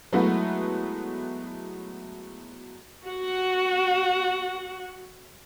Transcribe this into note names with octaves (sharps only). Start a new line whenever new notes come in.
F#3 G#3 A3 B3 E4 F#4
F#4 F#5